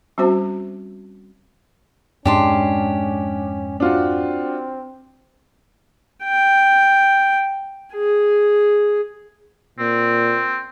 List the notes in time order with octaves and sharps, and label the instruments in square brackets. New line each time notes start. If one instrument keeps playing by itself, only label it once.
[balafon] G3 C4 C#4 F#4 C5
[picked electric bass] F2 G#2 G#3 [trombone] C#4 [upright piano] D4 [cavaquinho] G4 A5 C6
[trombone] C4 [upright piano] D4 F4 F#4
[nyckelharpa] G5
G#4
[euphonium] A#2 [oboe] C4